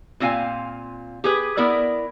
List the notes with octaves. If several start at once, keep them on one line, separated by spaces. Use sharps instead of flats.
A#2 C4 F4 F5 G#5
G4 G#4 B4
B3 E4 A#4 D5